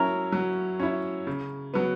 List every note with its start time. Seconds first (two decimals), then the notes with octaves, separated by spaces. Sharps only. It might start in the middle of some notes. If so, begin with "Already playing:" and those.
Already playing: F#3 C#4 E4 A#4
0.32 F#3
0.80 C#4 E4
1.27 C#3
1.74 F#3 B3